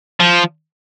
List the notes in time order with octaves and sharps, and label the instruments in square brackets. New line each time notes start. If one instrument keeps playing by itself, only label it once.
[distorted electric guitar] F3